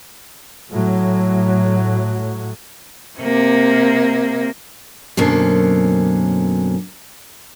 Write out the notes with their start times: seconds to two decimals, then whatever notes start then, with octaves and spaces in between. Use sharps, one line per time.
0.71 A2 F#3
3.19 C3 A#3
5.17 F#2 B2 D3 A#3 C4 C#4